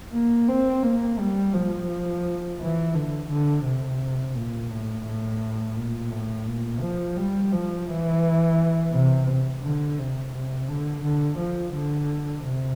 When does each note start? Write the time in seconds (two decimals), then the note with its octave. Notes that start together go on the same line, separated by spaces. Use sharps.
0.13 A#3
0.48 C4
0.83 A#3
1.19 G3
1.54 F3
2.60 E3
2.95 D3
3.29 D3
3.65 C3
4.35 A#2
4.70 A2
5.05 A2
5.76 A#2
6.10 A2
6.47 A#2
6.82 F3
7.17 G3
7.52 F3
7.87 E3
8.93 C3
9.63 D3
9.99 C3
10.33 C3
10.68 D3
11.04 D3
11.38 F3
11.74 D3
12.44 C3